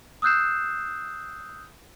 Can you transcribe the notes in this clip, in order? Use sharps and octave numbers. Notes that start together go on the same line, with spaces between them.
D#6 E6 F#6 G6 C7 E7